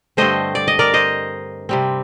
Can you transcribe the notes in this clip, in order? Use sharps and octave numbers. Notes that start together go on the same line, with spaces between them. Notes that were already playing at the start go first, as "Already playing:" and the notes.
G2 D3 A3 C4 C5 D#5
D5
D#5
A#4 D5
C5 D#5
C3 G3 C4